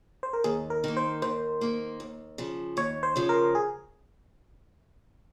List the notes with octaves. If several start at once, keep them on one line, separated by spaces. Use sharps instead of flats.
C5
A#4
D#2 G#4
A#4
D#3 A#3
C5
D#2 C5
D#3 A#3
D#2
C#3 F3
D#2 C#5
C5
C#3 F3
A#4
G#4